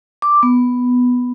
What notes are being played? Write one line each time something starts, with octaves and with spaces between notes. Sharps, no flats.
D6
B3